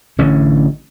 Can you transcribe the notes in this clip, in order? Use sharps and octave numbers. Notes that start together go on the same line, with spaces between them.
A1 D3 C#4